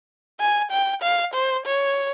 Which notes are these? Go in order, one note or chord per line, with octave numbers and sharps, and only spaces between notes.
G#5
G5
F5
C5
C#5